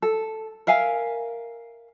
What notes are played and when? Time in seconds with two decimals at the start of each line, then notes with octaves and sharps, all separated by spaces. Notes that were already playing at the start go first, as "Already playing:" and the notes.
0.02 A4
0.67 A#4 E5 F5 G#5